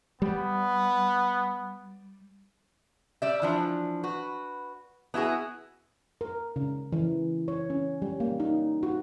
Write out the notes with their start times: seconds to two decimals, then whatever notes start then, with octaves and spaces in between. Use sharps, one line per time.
0.22 G3 B3
3.22 G3 D5 E5
3.42 E3 F3 D4
4.03 F#4 B4
5.14 B3 E4 F#4 G#4
6.21 A#4
6.56 C#3
6.92 E3
7.48 C#5
7.70 C#4
8.02 G3
8.20 A#3
8.40 D#4
8.83 F#4